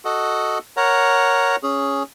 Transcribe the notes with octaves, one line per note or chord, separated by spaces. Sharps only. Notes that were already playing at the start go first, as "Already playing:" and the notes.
F#4 A4 D#5 F#5
A#4 C#5 F#5 A#5
C#4 G#4